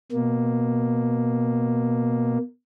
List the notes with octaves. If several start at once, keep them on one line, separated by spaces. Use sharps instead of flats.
B2 A#3